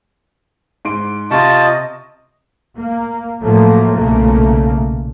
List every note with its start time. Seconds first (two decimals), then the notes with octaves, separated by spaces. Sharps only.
0.85 G#2 C6 D7
1.31 C3 F4 D#5 A5 C#6
2.75 A#3
3.42 A2 F3 F#3 A3 A#3
3.95 B1 A#2 C#3 A3 A#3